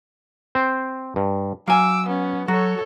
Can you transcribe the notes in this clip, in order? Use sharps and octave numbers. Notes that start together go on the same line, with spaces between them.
C4 C5
G2
F#3 F5 G#5 D6 E6
B3 C#4
F#3 F#4 A4 C#5